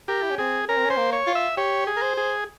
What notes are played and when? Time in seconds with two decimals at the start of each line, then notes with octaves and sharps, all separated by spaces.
0.08 G4 A#4
0.22 E4
0.30 C#4
0.38 C4 G#4
0.69 C#4 A#4
0.77 C4
0.85 C#4
0.90 C5
0.97 A#3
1.13 C#5
1.27 F4
1.35 E5
1.57 G4 C#5
1.87 G#4
1.96 A#4
2.02 C5
2.17 G#4